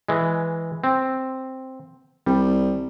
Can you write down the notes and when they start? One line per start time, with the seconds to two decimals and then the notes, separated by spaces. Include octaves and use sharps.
0.09 E3 G#3
0.84 C4
2.26 C2 G3